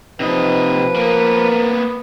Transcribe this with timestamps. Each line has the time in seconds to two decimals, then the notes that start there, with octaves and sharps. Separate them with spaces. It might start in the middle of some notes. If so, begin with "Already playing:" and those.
0.20 C3 F3 D#4 B4 D#5
0.96 A#3 B3 A#4